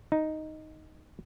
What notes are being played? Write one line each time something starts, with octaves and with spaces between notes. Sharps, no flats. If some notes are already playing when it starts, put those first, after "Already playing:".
D#4